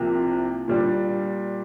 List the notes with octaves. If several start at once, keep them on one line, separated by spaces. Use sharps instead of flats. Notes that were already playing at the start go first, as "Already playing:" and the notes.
Already playing: C2 C3 F3 A#3
A#2 G3 D4